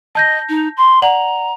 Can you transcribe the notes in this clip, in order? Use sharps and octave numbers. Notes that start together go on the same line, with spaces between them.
D#5 A5 G6 A#6
D#4
C6
D5 F#5 A#5 F#7